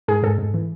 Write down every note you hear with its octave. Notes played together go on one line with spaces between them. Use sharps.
G#2 G#4
G#2 A4
G#2
E3